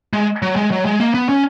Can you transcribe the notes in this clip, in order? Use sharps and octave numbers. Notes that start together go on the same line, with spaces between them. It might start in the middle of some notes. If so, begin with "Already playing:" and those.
G#3
F#3
G#3
F#3
G#3
A#3
B3
C#4